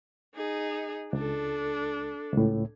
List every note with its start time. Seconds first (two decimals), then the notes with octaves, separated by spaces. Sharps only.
0.35 D#4 G#4
1.13 C#2 D4 A4
2.33 C#2 A2